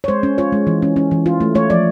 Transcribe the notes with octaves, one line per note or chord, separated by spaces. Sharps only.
C#5
G#3 C5
C#4
F4 C#5
G#3
E3
C#4
C#4
E3
F4
A3
A3 C#5
F3 D5